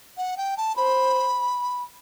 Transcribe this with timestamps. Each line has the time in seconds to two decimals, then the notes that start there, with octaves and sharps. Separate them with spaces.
0.17 F#5
0.37 G5
0.57 A5
0.76 C5 B5